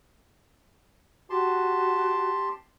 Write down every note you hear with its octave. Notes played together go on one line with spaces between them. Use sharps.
F#4 G4 A5 C6